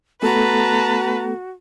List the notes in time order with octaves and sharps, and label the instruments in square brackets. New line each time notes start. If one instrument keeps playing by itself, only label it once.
[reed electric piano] A3 B3 A4 [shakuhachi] F#4 [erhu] B4 [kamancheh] A5 A#5